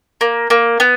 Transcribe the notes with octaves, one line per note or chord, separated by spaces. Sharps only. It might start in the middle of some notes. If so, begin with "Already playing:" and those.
A#3
A#3
B3